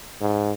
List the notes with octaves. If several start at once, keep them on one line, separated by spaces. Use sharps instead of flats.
G#2